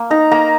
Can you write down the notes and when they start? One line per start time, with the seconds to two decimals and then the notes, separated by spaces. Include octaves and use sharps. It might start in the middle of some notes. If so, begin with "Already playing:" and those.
Already playing: A#3
0.10 D#4 A#5
0.31 A#3 A#5